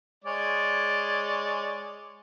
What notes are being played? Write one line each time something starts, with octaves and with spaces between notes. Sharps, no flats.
G#3 C#5 D5